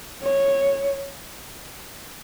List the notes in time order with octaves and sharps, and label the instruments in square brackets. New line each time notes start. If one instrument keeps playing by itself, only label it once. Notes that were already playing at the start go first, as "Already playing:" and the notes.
[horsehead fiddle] C#5